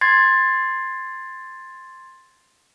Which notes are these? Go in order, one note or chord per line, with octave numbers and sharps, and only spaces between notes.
C6 G#6 A6 C7